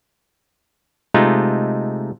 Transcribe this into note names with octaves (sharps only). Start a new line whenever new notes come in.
C3 G#3 A3 D#4 F4